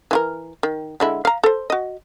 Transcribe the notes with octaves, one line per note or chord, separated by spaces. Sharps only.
E3 F4 A#4
D#3
D3 G#3 E4
F5 A#5
A4 C5
F#4 D#5